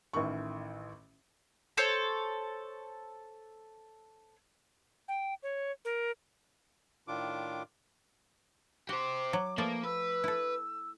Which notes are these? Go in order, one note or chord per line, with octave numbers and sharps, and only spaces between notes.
A1 A2 D#3 C#6
A4 C5 C#5
G5
C#5
A#4
A2 D#3 D4 F4 D6
F#4 G4 C5 D6
F#3
F3 A3 A#3 B4 D5
B4 E6
E4 A4